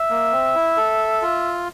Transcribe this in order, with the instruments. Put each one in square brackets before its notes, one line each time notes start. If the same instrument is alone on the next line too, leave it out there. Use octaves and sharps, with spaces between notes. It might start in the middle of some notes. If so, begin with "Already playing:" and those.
Already playing: [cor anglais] E5
[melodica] A#3
C4
E4
A4
F4